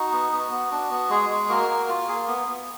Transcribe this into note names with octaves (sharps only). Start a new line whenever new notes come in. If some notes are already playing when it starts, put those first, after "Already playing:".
Already playing: D#4 F#4
B3
B3
B3
D4
B3
G#3 G#4
G#3
A#3 F#4 A#4
A#3
F4
A#3 G#4
B3
B3